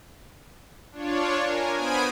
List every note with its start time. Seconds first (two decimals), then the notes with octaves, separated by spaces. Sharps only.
0.92 D4 F4 C#5
1.44 A#4 G#5
1.77 B3 C5 G#5 B5 D#6 D7